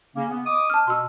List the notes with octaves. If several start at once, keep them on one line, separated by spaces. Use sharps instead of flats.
C#3 A#3 C#4
B3
D#5 D6 D#6
A5 F6
B2 C6 E6